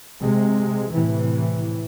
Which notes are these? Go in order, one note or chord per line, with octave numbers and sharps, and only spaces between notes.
C3 G#3
A2 C3 E3